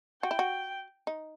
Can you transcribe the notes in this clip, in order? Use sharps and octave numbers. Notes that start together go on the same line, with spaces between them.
F#4 G5
E4
F#4
D#4